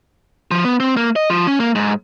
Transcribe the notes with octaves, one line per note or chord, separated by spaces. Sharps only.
F3
B3
C4
A#3
D#5
F3
C#4
A#3
G#2